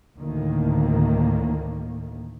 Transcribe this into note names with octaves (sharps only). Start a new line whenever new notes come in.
D2 A2 D#3 A#3